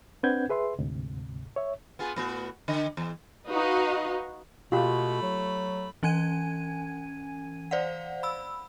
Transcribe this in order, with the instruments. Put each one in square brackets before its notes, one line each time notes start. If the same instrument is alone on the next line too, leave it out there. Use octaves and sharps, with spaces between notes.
[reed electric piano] C4 D4 B4 F#5 G6 G#6
G#4 B4 E5 C6
D2 G#2 C3
C#5 E5
[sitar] B3 F4 G#4
A2 B3 F#4
D3 D#5
E2
[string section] D#4 F#4 B4 D#5 F5
[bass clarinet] B2 [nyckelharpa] A3 B5 [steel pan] F4 G4
[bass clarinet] F#3
[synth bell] E3 C#4 G#5 G#6 D#7
C5 D5 F5 F#5
B5 E6